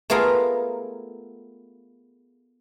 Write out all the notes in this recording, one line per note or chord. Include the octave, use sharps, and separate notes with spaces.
A3 B3 F4 G#4 A#4